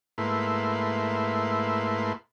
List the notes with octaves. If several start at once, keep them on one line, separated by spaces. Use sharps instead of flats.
G#2 A3 A#3 E4 B4 C6